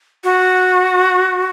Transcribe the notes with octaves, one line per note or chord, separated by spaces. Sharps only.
F#4